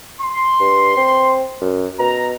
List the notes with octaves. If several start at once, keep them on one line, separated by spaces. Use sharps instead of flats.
C6
G2
C4
F#2
B2 A#5